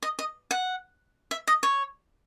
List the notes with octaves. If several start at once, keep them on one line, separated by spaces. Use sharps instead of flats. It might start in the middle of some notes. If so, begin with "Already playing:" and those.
D#5
D#5
F#5
E5
D#5
C#5